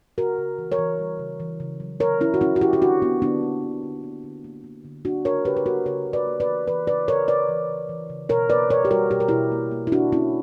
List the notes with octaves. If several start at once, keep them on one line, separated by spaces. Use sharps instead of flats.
C#3 F#4 A#4
C#3
E3
A#4 C#5
E3
G3
C#3
E3
C#3
F#3
D3 A#4 C#5
D3 C#4 E4
F#4
F#3 C#4 E4
F#4
D3 E4 G4
G4
D3 D4 F#4
A#3 B3 D4
D3 B3 D4
A#3
D3
D3
A#3
D3
A#3
A#3
D3
A#3 D4 F#4
C#3 A#4 C#5
C#3 G4 B4
B4
A#3 F#4 A#4
C#3 A#4 C#5
C#3
B4 D5
A#3
B4 D5
E3
E3 B4 D5
C#3 B4 D5
C#3 A#4 C#5
C#3 B4 D5
E3
C#3
E3
C#3
B2 A#4 C#5
A#3 B4 D5
B2 A#4 C#5
G4
G3 F#4 A#4
B2 G4
A#4
B2 E4 G4
A#3
A#3
E4
D3 D4 F#4
A#3 C#4 E4